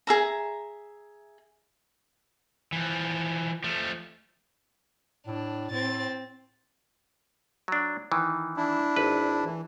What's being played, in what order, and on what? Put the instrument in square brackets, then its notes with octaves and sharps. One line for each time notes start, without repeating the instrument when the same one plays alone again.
[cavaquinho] G#4 E5 A#5
[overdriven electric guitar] E3 F3
F3 A3
[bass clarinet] A2 [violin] D4
[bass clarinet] A2 [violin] C4 A6
[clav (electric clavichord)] F#3 D4
D#3 E3
[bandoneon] D4 E4
[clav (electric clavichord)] G#1 B4
[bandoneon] E3